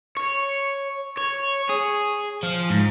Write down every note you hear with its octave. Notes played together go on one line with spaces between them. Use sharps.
C#5
C#5
G#4
F3
G#2